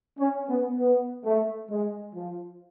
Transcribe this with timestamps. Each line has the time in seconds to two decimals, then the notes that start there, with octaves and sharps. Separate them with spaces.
0.19 C#4
0.49 B3
0.79 B3
1.25 A3
1.70 G#3
2.15 F3